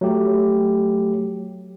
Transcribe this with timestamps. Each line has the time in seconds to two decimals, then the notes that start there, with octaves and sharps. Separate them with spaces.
0.01 F#3 A3 G4